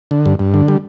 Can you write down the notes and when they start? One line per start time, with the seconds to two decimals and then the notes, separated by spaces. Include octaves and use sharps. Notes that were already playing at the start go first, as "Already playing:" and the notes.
0.11 D3
0.26 G2
0.39 G2
0.54 D3
0.68 G3